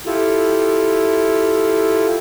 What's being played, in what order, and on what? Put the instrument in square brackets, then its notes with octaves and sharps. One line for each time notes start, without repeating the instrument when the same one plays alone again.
[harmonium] E4 F4 G4 A4